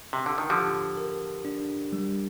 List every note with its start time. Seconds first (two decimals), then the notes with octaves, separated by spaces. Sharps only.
0.13 C3
0.26 D3
0.38 D#3
0.50 D3 F3 G4
0.97 A#4
1.45 D4
1.93 G3